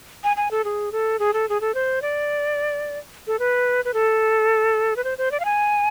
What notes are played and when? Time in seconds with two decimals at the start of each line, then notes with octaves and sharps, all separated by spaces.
0.24 G#5
0.37 G#5
0.51 A4
0.64 G#4
0.92 A4
1.19 G#4
1.33 A4
1.49 G#4
1.61 A4
1.74 C5
2.02 D5
3.27 A4
3.39 B4
3.85 B4
3.94 A4
4.96 B4
5.04 C5
5.18 C5
5.32 D5
5.40 F5
5.45 G#5